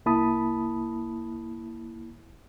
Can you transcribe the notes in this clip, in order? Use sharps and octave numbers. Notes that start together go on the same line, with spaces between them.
C2 A#3 E4 A5 B5 D#6